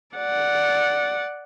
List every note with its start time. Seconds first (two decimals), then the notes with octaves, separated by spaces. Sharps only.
0.16 D5 F#5